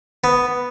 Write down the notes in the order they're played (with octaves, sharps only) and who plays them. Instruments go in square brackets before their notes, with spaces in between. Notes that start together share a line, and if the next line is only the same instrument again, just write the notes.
[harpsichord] B3